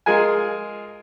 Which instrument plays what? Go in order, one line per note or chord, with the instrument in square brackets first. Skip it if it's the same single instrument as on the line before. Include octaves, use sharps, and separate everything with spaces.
[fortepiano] G#3 F4 G#4 A#4 G#5